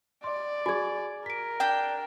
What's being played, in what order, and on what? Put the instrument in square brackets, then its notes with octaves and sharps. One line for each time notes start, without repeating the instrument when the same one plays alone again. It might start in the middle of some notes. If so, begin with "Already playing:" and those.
[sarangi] D5 [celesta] C6
[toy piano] F#4 G#4 [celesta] G#5 G#6
[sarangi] A#4 [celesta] B6 D7
[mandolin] D4 G5